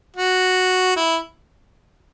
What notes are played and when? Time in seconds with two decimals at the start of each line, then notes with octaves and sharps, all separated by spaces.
0.16 F#4
0.96 E4